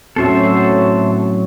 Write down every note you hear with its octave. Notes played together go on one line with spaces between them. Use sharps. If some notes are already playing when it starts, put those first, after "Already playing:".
A2 F#3 C4 C#4 F#4 A4 C5 E5